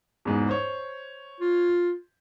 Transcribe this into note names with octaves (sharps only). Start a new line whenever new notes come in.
E2 G#2 B2
C5 C#5
F4